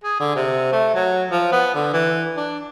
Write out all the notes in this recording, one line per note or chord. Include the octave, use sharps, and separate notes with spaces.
G#4
D3
C3
A3
F#3
F3
B3
D3
E3
D4